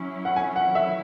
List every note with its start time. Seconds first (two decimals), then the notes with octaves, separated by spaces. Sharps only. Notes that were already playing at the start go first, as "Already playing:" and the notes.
Already playing: F#3 C#4 E4
0.25 F#5
0.36 G#5
0.56 F#5
0.75 E5